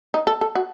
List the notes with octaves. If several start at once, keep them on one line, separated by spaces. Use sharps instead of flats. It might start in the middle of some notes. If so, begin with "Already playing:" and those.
D#4
A4
A4
F#4